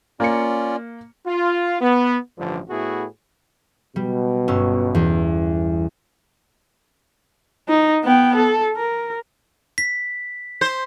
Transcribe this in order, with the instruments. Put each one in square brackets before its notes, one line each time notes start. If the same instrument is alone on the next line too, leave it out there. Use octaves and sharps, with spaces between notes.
[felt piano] A#3 C#7 [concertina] C#4 F4 D5
[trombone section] F4
B3
A1 G2 D3 F3
A2 A3 B3 E4 F#4 G#4
[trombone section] B2 [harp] G3
[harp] G1 C#4 E6
E2
[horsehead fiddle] D#4
B3 G5
A4
A#4
[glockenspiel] B6
[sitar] C5